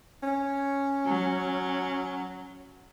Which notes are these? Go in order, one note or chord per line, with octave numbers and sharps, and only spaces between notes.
C#4
F#3